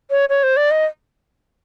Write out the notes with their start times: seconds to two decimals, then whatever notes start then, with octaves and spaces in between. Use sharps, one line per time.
0.11 C#5
0.29 C#5
0.43 C5
0.57 D5
0.71 D#5